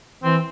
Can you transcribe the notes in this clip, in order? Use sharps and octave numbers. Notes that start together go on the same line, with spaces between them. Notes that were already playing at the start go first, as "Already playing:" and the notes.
E3 C4